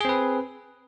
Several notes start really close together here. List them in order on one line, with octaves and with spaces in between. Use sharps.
G#4 C4 B4